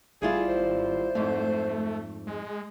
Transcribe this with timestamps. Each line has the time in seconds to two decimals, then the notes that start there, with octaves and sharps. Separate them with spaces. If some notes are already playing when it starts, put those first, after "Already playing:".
0.22 G1 G3 E4 F4 G#4
0.48 G#1 C5
1.15 F2 G#2 A3
2.27 G#3